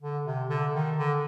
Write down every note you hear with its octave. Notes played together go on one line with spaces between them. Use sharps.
D3
C3
D3
D#3
D3